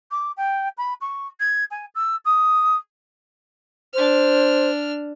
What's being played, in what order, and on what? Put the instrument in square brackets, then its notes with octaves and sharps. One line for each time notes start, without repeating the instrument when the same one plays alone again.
[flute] D6
G5
B5
C#6
G#6
G#5
E6
D#6
[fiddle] D4 F6 [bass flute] C5